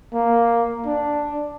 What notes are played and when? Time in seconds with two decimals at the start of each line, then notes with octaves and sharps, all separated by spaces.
0.13 A#3
0.86 D4